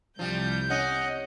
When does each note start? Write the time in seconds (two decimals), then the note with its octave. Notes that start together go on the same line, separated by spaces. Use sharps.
0.19 C2 F3 G3 G6
0.70 C#4 D#5 F#5